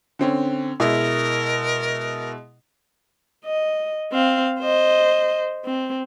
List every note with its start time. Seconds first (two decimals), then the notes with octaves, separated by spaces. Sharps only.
0.19 D3 C4 C#4
0.80 B2 G#3 E4 A#4
3.45 D#5
4.12 C4 F5
4.60 C5 D#5
5.65 C4